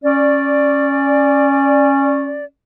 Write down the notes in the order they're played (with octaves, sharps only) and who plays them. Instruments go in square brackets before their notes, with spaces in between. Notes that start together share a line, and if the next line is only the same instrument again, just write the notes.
[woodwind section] C#4 D5